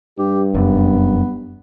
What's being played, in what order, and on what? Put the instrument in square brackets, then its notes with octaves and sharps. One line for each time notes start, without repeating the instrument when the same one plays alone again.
[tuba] G2 [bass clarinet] G4
[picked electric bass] F1 F#2 [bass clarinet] B3